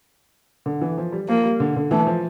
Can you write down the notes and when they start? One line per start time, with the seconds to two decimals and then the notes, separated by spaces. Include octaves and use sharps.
0.66 D3
0.82 E3
0.98 F3
1.12 G3
1.28 F3 A#3
1.44 G3
1.60 D3
1.76 D3
1.91 E3 A3
2.06 F3